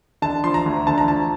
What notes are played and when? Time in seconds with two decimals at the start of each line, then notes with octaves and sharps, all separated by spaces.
0.22 D3 A5
0.44 F3 C6
0.54 A#5
0.66 D2
0.87 D3 A5
0.98 A#5
1.08 F3 A5